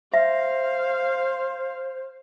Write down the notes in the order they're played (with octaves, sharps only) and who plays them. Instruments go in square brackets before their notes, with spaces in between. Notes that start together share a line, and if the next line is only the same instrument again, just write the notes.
[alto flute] C5 [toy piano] E5 [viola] F5